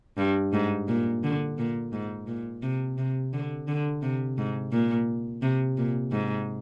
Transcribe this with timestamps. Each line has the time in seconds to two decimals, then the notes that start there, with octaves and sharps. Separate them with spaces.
0.18 G2
0.53 G#2
0.88 A#2
1.24 D3
1.58 A#2
1.93 G#2
2.27 A#2
2.63 C3
2.98 C3
3.33 D3
3.68 D3
4.02 C3
4.38 G#2
4.72 A#2
5.42 C3
5.77 A#2
6.12 G#2